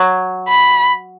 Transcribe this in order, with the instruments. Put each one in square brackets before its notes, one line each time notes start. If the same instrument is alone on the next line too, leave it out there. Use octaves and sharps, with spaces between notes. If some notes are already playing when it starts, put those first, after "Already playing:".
Already playing: [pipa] F#3
[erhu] B5